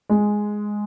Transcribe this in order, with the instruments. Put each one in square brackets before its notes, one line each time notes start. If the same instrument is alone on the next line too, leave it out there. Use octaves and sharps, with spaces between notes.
[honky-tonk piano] G#3